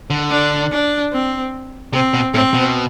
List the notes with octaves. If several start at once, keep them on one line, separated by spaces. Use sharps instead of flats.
D3
D4
D4
C4
C3 C4
B2
A2 C4
B2